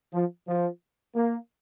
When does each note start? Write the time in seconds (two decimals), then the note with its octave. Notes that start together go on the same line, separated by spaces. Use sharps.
0.13 F3
0.48 F3
1.15 A#3